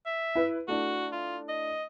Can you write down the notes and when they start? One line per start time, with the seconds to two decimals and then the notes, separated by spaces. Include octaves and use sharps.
0.06 E5
0.35 E4 B4
0.68 A3 D4 E4 F#4
1.12 F4
1.49 D#5